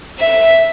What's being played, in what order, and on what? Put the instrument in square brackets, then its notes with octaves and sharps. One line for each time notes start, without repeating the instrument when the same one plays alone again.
[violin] E5